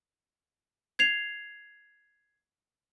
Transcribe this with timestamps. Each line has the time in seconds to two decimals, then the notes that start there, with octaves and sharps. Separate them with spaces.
0.99 G#6 C7 F7